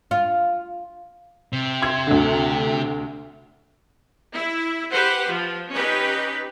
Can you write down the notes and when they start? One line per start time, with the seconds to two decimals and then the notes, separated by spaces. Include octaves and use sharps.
0.11 F4
1.53 C3
1.82 C6 G#6
2.07 D2 D3
4.33 E4
4.93 G4 B4 C5 F#5
5.29 F3
5.72 C#4 D#4 G4 B4